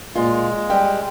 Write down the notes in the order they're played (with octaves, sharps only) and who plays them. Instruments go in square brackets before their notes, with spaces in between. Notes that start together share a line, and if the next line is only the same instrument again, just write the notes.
[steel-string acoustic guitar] A#2 F4 [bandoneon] G#3
[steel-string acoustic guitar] G3 G5